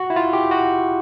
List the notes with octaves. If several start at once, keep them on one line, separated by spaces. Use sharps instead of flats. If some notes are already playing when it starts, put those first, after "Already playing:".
Already playing: F#4
E4
F4
G4
F#4